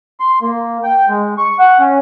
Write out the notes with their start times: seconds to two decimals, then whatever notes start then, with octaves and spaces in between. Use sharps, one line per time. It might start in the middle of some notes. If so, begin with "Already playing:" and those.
0.20 C6
0.42 A#3
0.84 G5
1.09 G#3
1.38 C#6
1.59 F#5
1.79 C#4